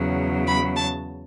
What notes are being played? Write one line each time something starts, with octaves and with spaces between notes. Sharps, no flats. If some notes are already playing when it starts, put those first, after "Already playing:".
Already playing: E2 C#3 F#3
B5
A5